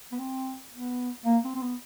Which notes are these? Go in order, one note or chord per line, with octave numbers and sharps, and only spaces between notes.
B3
C4
B3
A#3
C4
C4
B3